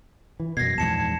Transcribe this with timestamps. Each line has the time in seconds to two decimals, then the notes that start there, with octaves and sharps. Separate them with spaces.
0.40 E3
0.57 F#2 B2 G#6 A#6 C7
0.78 A#1 E2 G#2 A5 G#6 C#7 E7